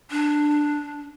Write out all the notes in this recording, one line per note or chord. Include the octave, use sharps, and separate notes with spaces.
D4